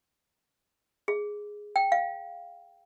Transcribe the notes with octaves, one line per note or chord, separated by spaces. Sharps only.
G#4
G5
F5